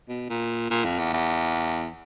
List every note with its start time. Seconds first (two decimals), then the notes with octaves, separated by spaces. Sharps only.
0.09 B2
0.29 A#2
0.70 A#2
0.84 F2
0.99 E2
1.13 E2